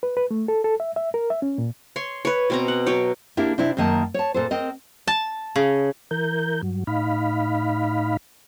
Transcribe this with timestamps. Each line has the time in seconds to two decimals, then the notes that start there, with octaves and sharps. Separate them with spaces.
0.03 B4
0.17 B4
0.31 A3
0.48 A4
0.64 A4
0.80 E5
0.96 E5
1.14 A#4
1.30 E5
1.42 C#4
1.58 A#2
1.96 C#5 C6
2.25 B4 C#5
2.50 B2 C4 A#5
2.68 F#5
2.86 F#3 C#5 G5
3.37 A#3 D4 E4 G4 A#4
3.58 C3 D4 E4
3.77 F#2 D#3 A#3 D#5 A5
4.14 C#5 A5
4.34 A#2 A4 C5
4.51 C4 A#4 D#5
5.07 A5
5.56 C#3
6.11 E3 A#4 G6
6.63 G2 F#3
6.87 A2 D#4 F5 B5